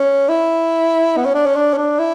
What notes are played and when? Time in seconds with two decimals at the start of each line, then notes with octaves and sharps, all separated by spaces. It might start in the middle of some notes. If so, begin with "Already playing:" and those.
Already playing: C#4
0.28 E4
1.17 B3
1.25 C#4
1.35 D4
1.46 C#4
1.56 D4
1.73 C#4
1.77 D4
1.99 E4